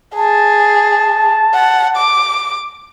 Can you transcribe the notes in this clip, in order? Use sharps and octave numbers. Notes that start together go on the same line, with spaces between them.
G#4 A5
F#5
D6